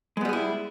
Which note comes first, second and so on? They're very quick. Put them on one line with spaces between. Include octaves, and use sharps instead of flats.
G#3 B3 G3 G#4 E4